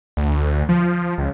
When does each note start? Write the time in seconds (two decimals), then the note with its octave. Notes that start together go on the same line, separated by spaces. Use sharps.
0.17 D2
0.69 F3
1.18 C#2